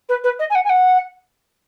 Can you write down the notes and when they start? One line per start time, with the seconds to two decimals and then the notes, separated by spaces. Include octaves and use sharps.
0.09 B4
0.24 B4
0.39 D#5
0.50 G#5
0.55 F#5
0.64 G#5
0.69 F#5